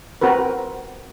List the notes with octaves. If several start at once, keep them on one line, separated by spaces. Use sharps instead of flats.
C4 F#4 A#4 B4